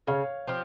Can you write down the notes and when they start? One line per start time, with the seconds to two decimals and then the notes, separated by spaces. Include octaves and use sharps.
0.07 C#3 C#5 F5
0.47 F3 C4 G4